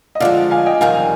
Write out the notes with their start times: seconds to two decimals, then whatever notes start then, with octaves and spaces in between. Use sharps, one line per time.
0.15 D#5
0.20 D3 F3 G#3 D5 F5
0.51 F5 G#5
0.66 D#5 G5
0.81 F2 C3 D#3 G3 F5 G#5